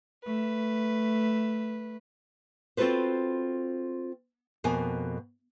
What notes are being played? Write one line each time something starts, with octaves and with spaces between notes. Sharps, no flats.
A3 B4
C4 F4 F#4 A4 B4 C5
F2 B2 A#3 G#5